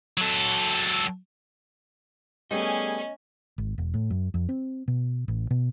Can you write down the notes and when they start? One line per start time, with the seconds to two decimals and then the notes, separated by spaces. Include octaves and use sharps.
0.17 F#3 A4
2.51 G3 A3 B3 C#4 G4 G#4 D#5 G#5
3.58 G#1
3.78 E1
3.94 A2
4.10 F#2
4.34 F2
4.49 C4
4.88 B2
5.28 A1
5.50 B2